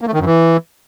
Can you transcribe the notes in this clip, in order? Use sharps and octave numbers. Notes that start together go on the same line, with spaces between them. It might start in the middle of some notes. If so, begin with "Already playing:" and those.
A#3
A3
D#3
F#2
E3